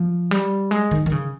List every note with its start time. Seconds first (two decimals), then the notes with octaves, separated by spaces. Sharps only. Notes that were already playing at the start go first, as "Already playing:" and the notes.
Already playing: F3
0.31 G3
0.71 G#3
0.91 D#3
1.06 D#3
1.12 C#3